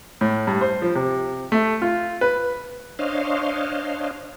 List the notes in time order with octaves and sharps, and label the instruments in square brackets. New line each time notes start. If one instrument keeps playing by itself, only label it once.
[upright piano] A2
G2
C5
F3
C3
A3
F4
B4
[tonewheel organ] D4 C5 C#5 D#5 F5